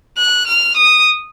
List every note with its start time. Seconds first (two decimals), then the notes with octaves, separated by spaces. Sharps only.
0.17 F#6
0.47 F6
0.76 D#6